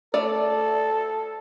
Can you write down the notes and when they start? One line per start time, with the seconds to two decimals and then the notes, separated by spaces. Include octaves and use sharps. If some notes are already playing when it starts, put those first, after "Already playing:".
0.14 A3 A4 D5